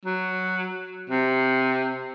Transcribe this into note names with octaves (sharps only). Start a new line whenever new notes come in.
F#3
C3